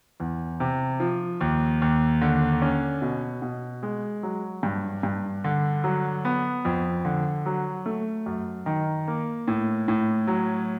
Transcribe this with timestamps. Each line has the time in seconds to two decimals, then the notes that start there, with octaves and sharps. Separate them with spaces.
0.20 E2
0.60 C3
1.00 F3
1.41 D#2
1.82 D#2
2.21 D3
2.62 C#4
3.02 B2
3.42 B2
3.83 G#3
4.23 F#3
4.63 G2
5.03 G2
5.44 D3
5.84 F#3
6.25 B3
6.65 F2
7.05 D3
7.46 F#3
7.86 A3
8.26 F#2
8.66 D#3
9.08 A#3
9.48 A2
9.88 A2
10.27 F#3